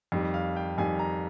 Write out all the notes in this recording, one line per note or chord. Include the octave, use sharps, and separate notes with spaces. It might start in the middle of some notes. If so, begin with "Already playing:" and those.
F2 D#3 G3
F5
G5
F2 D#3 G3 G#5
A#5